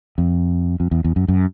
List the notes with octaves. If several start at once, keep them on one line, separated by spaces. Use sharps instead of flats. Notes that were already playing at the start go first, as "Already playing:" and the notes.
F2
F2
E2
E2
F#2
F#2